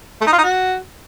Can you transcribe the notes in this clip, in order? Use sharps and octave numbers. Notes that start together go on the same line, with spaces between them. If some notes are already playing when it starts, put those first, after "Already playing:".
A3
D#4
F4
D#4
F#4